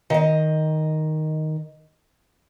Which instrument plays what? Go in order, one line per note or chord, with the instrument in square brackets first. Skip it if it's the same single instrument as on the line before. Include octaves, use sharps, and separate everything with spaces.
[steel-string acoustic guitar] D#3 D#5